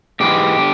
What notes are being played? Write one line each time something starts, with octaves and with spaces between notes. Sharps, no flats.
G#2 E3 G#3 G4
D3